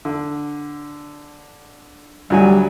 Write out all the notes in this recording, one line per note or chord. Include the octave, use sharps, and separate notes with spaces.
D3
D2 F#3 G3 G#5